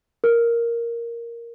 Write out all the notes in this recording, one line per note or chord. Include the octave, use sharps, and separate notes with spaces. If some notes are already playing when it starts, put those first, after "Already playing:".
A#4